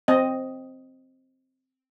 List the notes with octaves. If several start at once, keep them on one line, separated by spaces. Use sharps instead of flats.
C4 D#5